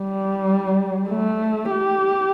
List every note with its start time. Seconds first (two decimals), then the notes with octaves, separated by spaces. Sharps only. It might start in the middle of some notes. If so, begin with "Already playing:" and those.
Already playing: G3
1.10 A3
1.71 G4